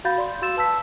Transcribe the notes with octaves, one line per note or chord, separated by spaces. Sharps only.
F#4 F5 F#5 B5 G6 A6
D5 C6
F#4 F5 C6 E6 A6 E7
B4 A5 E6 B6